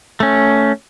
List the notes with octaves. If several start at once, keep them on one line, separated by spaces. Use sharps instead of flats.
A3 C#4